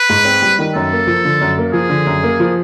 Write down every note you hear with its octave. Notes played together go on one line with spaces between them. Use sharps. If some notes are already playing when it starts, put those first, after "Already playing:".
Already playing: B4
G#2
C4
G3
D#3
F#2 A4
A#3
F3
D3
F#2
A#3
F3 G#4
D3
F#2
A#3
F3